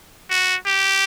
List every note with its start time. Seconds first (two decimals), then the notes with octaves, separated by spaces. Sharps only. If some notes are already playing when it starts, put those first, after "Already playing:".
0.30 F#4
0.66 G4